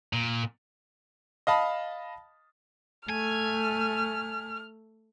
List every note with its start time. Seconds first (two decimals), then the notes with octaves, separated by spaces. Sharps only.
0.13 A#2
1.47 D#5 F5 A5 B5
3.09 A3 G#5 F6